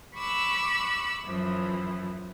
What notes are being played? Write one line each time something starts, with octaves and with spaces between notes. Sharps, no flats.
B5 C#6 D6 E6 F#6
F#2 E3 F3